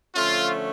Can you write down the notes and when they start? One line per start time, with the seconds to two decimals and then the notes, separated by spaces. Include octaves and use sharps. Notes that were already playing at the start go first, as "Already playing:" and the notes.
0.15 D3 F3 A3 C#4 F4